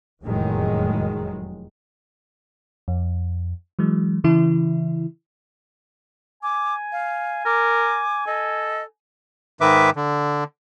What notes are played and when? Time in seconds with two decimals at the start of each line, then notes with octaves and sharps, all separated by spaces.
0.23 F1 E2 A2 D#3 F#3 G#3
2.88 F2
3.79 E3 F#3 G#3
4.24 C#3 E3 E4
6.43 G#5 D6
6.92 F5
7.46 A#4 D6
8.27 A4 D#5
9.61 G#2 D#3 B4 E5 D6
9.96 D3